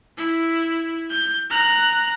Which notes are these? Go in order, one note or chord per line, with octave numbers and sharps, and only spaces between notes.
E4
G6
A#5 F#6